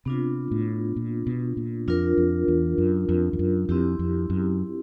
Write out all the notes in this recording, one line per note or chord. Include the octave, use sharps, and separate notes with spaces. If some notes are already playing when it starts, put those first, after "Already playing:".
C3 B3 D4 F4
A2
A#2
B2
A#2
F2 D4 F4 A#4
F2
E2
F#2
F2
F2
F#2
F2 C4 E4 G4
F2
F#2